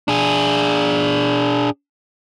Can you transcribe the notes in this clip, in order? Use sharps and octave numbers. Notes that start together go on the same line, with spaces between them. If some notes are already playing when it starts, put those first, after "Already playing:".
D4 G#4